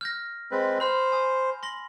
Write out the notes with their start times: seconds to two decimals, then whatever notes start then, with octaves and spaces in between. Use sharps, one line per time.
0.01 F6 G6 A#6
0.51 G#3 C4 B4
0.80 C5 B5 F6 F7
1.12 G#5 D#6
1.63 C6 A#6 F#7